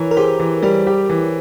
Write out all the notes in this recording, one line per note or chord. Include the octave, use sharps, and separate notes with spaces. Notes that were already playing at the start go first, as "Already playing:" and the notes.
Already playing: E3 A#4 C#5
A#4
G4 G#4 C5
E3
G3 G4 A#4
G4
E3